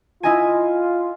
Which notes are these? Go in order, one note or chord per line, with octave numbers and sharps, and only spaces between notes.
E4 F4 D#5 G#5